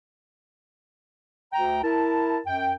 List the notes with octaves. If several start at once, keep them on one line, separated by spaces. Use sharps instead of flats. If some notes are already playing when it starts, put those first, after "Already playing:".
D2 G5 A#5
E4 A#4 A5
F#2 G5